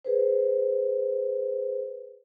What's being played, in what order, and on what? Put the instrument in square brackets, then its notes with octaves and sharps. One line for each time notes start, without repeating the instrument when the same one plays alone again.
[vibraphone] G#4 B4 C5